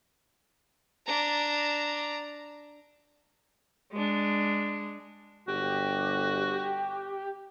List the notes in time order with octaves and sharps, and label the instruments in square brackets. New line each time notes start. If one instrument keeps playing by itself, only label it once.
[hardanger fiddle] D4 A#5
[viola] G#3 D4
[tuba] G1 [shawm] F#4 [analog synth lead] G4